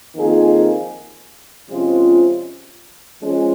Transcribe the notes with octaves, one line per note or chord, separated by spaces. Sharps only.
F2 D#3 A#3 F4 G#4
C3 F3 G#3 C#4 F4
F3 G#3 C#4